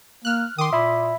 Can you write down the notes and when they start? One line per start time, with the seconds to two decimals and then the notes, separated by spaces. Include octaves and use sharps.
0.25 A#3 F6 F#6
0.58 D#3 C6 D6 D#6
0.73 A#2 E5 B5